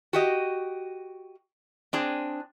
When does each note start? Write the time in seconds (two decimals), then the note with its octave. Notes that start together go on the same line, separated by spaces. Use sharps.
0.13 F#4 G4 D#5
1.93 C4 D4 G#4